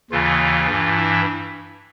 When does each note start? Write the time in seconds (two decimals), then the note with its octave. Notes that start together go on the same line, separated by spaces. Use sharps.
0.11 D#2 C#3 E3 F4
0.68 G2 E3
0.97 E4